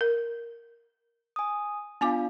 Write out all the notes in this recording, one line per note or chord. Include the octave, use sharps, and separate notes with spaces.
A#4
G#5 D#6
B3 D4 F4 F5 G#5 D6